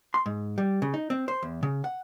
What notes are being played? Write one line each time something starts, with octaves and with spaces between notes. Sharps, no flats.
C6
G#2
G3
C#3
D#4
C4
C5
E2
C#3
F#5